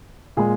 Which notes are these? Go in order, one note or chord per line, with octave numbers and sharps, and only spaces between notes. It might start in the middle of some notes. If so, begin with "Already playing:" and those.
A#2 G#3 G#4